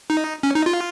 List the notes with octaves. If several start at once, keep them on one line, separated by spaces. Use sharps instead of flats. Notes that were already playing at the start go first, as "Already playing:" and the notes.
D#4
C#4
D#4
F4